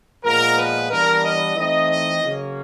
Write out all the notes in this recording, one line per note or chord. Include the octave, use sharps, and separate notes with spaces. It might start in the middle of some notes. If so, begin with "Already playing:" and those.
A#2 F3 G#3 B3 A#4
B4
E3 G3 B3 D4 A#4
D#5
E3 A3 C4 D#4 D#5
D#5
C#3 F#3 A#3 C#4